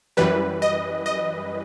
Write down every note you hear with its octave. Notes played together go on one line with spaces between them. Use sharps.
F#2 E3 G3 B4
D#5
D#5